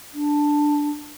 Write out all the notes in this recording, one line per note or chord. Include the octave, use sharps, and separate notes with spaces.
D4